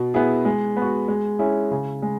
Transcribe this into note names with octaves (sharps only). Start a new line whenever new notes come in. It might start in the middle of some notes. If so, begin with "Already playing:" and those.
Already playing: B2
B3 E4 G#4
G#3
B3 F#4
G#3
C#4 E4 G#4
C#3
G#3